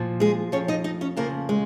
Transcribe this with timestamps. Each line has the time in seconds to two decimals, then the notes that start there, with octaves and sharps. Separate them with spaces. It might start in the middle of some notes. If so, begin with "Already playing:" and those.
Already playing: A#2 F3
0.20 G#3 G#4
0.52 F2 F3 C#4 C#5
0.68 D#4 D#5
0.84 D#4 D#5
1.01 C#4 C#5
1.16 F2 C#3 F3 A#3 A#4
1.49 G#3